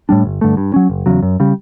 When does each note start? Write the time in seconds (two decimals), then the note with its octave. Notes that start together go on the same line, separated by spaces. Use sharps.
0.09 A2 G3 D4
0.25 G1
0.41 G2 D3 A3
0.57 G2
0.74 F#3 C#4
0.90 F#1
1.06 E2 C#3 F#3
1.23 F#2
1.40 C#3 G3